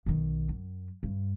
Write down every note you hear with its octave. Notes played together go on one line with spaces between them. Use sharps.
B1 D#3
F#2
G2